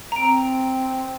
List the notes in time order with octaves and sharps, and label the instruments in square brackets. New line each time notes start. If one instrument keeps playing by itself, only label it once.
[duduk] C4 [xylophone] A#5 D7